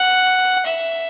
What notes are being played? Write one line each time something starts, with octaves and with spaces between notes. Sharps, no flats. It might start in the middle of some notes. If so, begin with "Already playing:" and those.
Already playing: F#5
E5